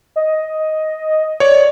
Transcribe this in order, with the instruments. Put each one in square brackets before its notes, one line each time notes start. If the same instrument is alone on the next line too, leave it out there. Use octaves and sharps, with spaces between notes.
[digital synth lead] D#5
[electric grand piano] C#5 D5